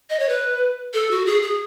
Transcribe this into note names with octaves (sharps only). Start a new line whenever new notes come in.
D#5
C#5
B4
A4
F#4
G#4
G#4